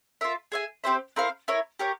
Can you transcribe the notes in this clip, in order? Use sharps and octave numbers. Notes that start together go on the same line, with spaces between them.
F4 A#4 E5
G#4 E5 G#5
C4 G4 C5 E5
C4 E4 A#4 F5
E4 A#4 C#5
G4 A#4 C#5